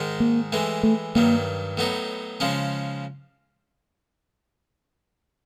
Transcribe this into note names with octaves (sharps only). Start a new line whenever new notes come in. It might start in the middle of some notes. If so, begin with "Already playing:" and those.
Already playing: G#2 D#3 G#3
A#3
A2 E3 G#3
A3
G2 D#3 F#3 A#3
A2 F#3 B3 D#4
C#3 F3 G#3 C#4